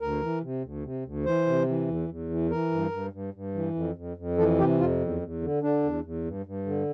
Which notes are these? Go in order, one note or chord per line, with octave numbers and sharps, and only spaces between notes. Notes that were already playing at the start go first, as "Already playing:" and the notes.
D2 A#4
E3
C3
D2
C3
D2
E3 C5
C3
E3
E2
E2
E3
E3 A#4
G2
G2
G2
G2
E3
F2
F2
F2
E3 A4
C3 G4
F2 F4
E2
E2
D3
D3 D4
E2
E2
G2
G2
D3